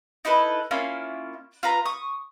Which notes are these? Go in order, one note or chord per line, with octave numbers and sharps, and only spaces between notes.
D#4 E4 A4 B4
A#3 C#4 E4 F4
F4 B4 A#5
C#6 D#6